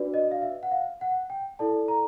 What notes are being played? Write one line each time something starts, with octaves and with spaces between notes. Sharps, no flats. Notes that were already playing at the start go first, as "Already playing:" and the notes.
Already playing: D4 F#4 B4 D5
D#5
F5
E5
F#5
F5
F#5
G5
E4 A4 D5 A5
A#5